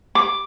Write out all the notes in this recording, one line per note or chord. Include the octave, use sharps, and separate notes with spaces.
D6